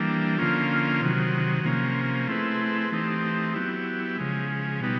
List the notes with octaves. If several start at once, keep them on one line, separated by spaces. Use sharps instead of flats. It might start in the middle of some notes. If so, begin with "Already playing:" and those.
Already playing: E3 G3 A#3 D4
D3 F3 A#3 C#4 F4
C3 D#3 F#3
C3 F3 A#3 C#4
A3 C4 E4 G#4 B4
E3 A3 C4 D#4 G4
F#3 B3 E4 G4
C#3 F3 G#3
B2 G3 B3 D#4